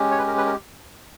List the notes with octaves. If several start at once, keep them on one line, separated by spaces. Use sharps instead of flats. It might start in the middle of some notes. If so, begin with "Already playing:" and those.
Already playing: G#3 C#4 G4
C#5
B4
A#4
B4
A#4